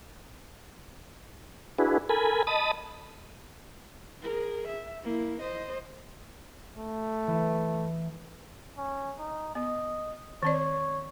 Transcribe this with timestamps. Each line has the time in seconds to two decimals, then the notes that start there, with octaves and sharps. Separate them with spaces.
1.79 D4 E4 F#4 G#4 B4
2.09 A4 A#4 G#5 B5
2.47 D#5 A5 B5 D#6
4.22 G#4 A#4
4.68 E5
5.04 A#3 E4
5.41 C5 D#5
6.77 A3
7.27 E3
8.77 C#4
9.19 D#4
9.55 B3 D#5
10.43 D#3 C4 C#5 D5